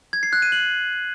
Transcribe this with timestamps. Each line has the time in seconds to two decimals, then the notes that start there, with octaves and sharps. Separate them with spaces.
0.13 G#6
0.23 C7
0.33 F#6
0.42 D#7
0.52 F#7